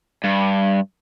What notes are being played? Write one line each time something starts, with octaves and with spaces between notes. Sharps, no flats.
G2